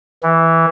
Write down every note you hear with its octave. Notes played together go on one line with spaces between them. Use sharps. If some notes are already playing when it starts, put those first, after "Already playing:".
E3